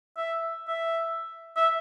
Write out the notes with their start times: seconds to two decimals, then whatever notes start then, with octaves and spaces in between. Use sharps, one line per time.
0.17 E5
0.68 E5
1.56 E5